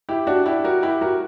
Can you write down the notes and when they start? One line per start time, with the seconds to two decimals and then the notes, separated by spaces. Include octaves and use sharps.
0.09 E4 G4
0.27 D4 F#4
0.46 E4 G4
0.64 F#4 A#4
0.82 E4 G4
1.01 F#4 A#4